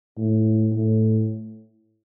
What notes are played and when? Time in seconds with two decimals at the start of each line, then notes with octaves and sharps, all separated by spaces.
0.18 A2
0.73 A2